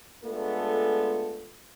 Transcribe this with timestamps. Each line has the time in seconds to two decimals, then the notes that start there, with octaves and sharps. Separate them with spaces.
0.25 G#3 A3 B3 D4 F4 A4